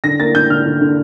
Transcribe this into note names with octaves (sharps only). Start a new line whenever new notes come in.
D3 A#6
A#3 A6
D3 G6
D3 F6
D3
D3